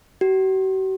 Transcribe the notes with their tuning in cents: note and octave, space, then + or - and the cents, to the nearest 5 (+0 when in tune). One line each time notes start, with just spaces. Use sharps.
F#4 +45